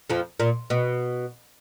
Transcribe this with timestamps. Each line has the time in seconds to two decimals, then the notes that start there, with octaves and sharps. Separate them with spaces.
0.10 F2 F3
0.40 A#2
0.70 B2